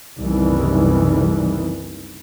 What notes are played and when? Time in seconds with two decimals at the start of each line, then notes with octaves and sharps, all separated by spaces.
0.18 F#1 C2 C3 D#3 E3 G3